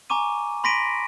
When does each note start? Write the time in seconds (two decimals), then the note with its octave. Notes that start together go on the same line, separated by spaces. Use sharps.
0.10 G#5 A#5 C#6 D6 D#7
0.64 B5 C6 A#6 B6 D7 D#7